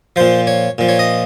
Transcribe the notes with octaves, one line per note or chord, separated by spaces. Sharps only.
A#2 F3 C5
C#5
A#2 F3
C#5
D#5